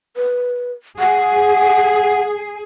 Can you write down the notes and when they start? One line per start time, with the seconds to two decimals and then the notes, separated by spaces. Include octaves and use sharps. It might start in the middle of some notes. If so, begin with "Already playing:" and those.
0.16 B4
0.99 G#4 F#5